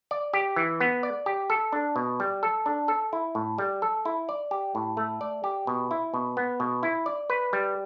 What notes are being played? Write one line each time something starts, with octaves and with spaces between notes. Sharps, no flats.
D5
G4
E3
B3
D5
G4
A4
D4
B2
G3
A4
D4
A4
E4
A2
G3
A4
E4
D5
G4
A2
A3
D5
G4
B2
E4
B2
B3
B2
E4
D5
B4
G3